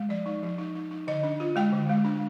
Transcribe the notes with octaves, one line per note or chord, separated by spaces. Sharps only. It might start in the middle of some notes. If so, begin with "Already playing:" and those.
Already playing: G#3
F3 D5
D#4
F3
D#4
D#4
D#4
D3 D#5
D4
F4
G#3 G5
D3
G#3
D4